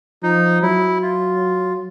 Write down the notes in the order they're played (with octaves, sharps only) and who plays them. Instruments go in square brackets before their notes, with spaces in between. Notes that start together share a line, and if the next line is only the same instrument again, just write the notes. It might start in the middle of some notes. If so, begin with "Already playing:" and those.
[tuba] F3 [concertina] D#4
[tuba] F#3 [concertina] E4
[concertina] F4